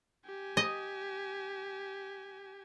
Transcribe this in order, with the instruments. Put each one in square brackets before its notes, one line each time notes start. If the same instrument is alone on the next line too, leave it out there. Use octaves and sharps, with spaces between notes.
[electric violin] G4 G#5
[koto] D#5